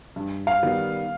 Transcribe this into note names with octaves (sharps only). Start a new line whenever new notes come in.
G2
F5
D#3 G3 B3